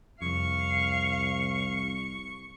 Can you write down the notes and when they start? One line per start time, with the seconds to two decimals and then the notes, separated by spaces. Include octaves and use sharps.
0.22 C2 F2 F5 C#6